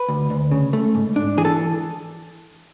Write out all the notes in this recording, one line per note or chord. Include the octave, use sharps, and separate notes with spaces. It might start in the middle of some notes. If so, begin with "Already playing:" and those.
Already playing: B4
D2
D2
C#3
A3
G#2
D4
E3 G#4
A4